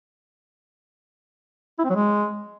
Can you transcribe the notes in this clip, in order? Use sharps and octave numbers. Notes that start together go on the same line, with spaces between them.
E4
C4
F#3
G#3